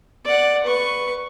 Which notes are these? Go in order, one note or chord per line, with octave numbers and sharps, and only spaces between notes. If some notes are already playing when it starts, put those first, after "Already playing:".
D5 F#5
B4 C#6